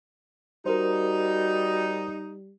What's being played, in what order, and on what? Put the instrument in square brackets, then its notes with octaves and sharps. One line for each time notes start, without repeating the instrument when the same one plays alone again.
[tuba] G3 [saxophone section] D#4 [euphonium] F#4 [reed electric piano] A#4 C5